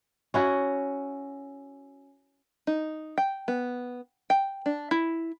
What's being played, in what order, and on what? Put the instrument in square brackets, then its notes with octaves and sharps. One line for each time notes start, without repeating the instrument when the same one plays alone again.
[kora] C#4 E4 F#4
[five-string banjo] D#4
G5
B3
G5
D4
E4